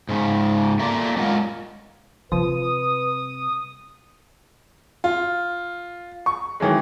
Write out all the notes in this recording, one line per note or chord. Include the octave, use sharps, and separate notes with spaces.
G#2 C#3
A3 A#3 F4 D5
G#3 C#4 F4 A#4 D#5 F#5
C3 F3 G3 B4 D#6
F4
C#6
D#3 E3 F#3 G#3